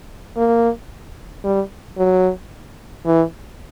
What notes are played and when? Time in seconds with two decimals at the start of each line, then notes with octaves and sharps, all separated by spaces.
0.37 A#3
1.44 G3
1.98 F#3
3.06 E3